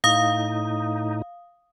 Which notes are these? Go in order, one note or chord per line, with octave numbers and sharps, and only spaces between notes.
A2 D#4 F5 D#6